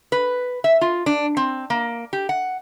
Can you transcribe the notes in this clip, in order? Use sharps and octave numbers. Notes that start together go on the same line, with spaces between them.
B4
E5
F4
D4
C4
A#3
G4
F#5